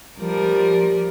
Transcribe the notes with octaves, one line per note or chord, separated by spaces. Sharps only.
F3 G3 A#4